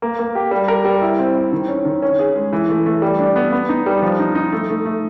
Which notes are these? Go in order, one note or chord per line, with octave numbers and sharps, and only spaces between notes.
A#3
A#3
G4
G3
A#4
G3
E4
C4
C4
D#3
C#4
D#3
C#4
G#4
G#3
E3
A3
A3
G3
D4
B3
B3
D#4
G3
F3
D#4
D#4
A3
A3
A3